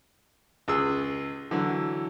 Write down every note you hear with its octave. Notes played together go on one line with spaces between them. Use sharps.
C#2 G#4 E6
D3 E3 F#3